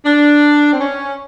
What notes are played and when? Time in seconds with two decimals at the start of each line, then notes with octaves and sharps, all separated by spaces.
0.04 D4
0.73 C4
0.81 C#4